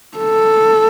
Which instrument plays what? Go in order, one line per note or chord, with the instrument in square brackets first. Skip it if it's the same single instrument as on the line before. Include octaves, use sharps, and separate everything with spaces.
[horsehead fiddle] A4